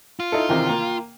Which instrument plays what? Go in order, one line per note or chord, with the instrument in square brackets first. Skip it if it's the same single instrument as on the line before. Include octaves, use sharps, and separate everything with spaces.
[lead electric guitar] F4
[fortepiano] D#4 E4 A4
C3 D#3 E3
A#3 G5